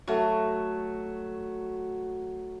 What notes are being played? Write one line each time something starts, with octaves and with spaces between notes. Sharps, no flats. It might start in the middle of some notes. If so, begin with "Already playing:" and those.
F#3 A3